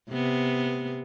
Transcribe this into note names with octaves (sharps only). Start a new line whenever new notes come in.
C3 B3